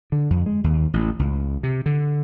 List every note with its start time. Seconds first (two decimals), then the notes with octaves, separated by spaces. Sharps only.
0.12 D3
0.30 F2
0.46 G#3
0.64 D#2
0.94 A1
1.19 C#2
1.63 C3
1.86 D3